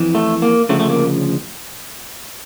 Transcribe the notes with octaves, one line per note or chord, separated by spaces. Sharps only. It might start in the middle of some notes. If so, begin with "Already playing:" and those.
Already playing: F2 E3
A3
A#3
D2 C#3 F3 A3
A3
A#3